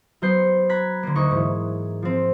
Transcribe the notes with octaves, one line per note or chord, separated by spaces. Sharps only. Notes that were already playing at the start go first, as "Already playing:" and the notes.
F#3 B3 C5 G6 C7 C#7
A#5 B5 F#6 G#6 B6
D3 A#3
D2 D#4 C#6
G#2 E3
F3 C4